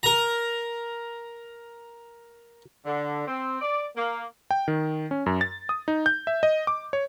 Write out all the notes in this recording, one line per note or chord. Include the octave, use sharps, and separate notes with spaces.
A#4 A#5
D3
C4
D5
A#3
G5
D#3
C#4
F#2
A6
D#6
D#4
G6
E5
D#5
D6
C#5